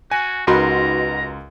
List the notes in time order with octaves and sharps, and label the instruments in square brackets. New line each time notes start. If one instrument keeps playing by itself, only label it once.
[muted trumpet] F#4 [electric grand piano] G#5
[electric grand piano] C#2 A#4 C6 [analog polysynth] D#4 F#4 B4 [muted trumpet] A#5